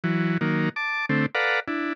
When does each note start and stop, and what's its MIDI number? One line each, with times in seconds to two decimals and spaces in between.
0.04 0.38 52
0.04 0.38 54
0.41 0.69 51
0.41 0.69 54
0.41 0.69 58
0.76 1.06 81
0.76 1.06 86
1.09 1.26 50
1.09 1.26 57
1.09 1.26 60
1.35 1.60 69
1.35 1.60 71
1.35 1.60 74
1.35 1.60 77
1.35 1.60 78
1.35 1.60 82
1.68 1.93 62
1.68 1.93 64